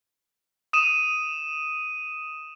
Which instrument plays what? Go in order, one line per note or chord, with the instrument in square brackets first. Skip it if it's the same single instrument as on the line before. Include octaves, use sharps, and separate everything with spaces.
[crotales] D#6 D#7 E7